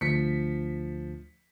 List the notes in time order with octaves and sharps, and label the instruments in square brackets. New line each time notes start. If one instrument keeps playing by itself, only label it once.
[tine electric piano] D2 [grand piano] F3 B6 C#7